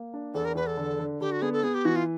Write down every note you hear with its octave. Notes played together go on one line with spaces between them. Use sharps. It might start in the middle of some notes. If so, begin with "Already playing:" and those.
Already playing: A#3
D4
E2 A4
A#4
E2 B4
A4
D3
D3
D3 G4
F#4
B3 G#4
A4
B3 G#4
G4
E3 F#4
F4